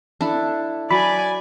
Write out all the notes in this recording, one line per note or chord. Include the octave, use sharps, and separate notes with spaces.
D4 E4 A4
F#3 D5 G#5 B5